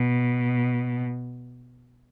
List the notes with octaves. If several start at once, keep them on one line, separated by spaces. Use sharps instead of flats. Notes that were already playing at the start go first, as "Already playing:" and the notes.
Already playing: B2